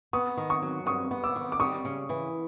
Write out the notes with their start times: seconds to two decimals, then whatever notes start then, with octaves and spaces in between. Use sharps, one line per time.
0.13 B3 C#6 D#6
0.37 D#3
0.50 C#6 D#6
0.62 F#3
0.86 G2 C#6 D#6
1.11 B3
1.24 D6 E6
1.36 D#3
1.52 D6
1.60 G3 C#6 D#6
1.85 C#3
2.09 E3